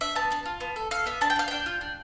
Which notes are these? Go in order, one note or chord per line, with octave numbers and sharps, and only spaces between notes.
D4 E5
B3 A5
D4 A5
F4
B3
A4
A4 F5
B3 E5
D4 A5
G5
D4 F5
D4 G5
F4
D4